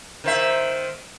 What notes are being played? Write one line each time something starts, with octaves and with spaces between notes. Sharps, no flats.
D#3 C5 E5